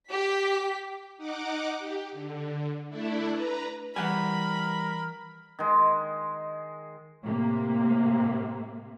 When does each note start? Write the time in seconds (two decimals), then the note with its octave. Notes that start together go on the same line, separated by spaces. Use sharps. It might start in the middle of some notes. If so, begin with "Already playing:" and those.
0.11 G4 B6
1.17 D#4 F#5 D6
1.78 G4
2.12 D3
2.89 A3 D4 E4
3.32 B4 A#5
3.96 E3 G3 A#4 F#5 G#5 B5
5.59 D#3 G#3
7.24 A2 C3 A#3